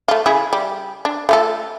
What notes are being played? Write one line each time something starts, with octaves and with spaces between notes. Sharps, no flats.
A3 F4
C#3 E4 G#4
G3
D4
A3 F4 A4